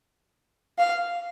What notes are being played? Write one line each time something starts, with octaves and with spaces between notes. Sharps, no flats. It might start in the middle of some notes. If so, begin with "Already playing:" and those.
F5